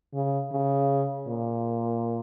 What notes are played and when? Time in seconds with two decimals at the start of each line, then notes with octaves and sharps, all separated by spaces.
0.14 C#3
0.52 C#3
1.27 A#2